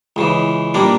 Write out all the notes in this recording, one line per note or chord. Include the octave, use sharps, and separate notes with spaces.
C#2 C#3 E3
A#2 G3 A#3 D4